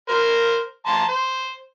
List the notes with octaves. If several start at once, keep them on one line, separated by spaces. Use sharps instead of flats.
A#4 C5
A5 A#5 C6
C5